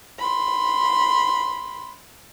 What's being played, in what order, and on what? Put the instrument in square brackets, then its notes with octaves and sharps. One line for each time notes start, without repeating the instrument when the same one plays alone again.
[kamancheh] B5 C6